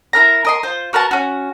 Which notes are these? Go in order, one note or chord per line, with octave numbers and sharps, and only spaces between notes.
E4 A#4 A#5
A#4 D#5 C6
F4 C5
F#4 A#4 B4 A5
C#4 F#4